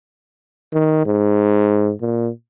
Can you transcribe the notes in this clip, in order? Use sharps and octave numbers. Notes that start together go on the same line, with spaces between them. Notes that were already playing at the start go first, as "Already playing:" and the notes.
D#3
G#2
A#2